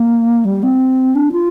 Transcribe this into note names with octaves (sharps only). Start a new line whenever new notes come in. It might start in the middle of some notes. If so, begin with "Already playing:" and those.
Already playing: A#3
G3
C4
D4
F4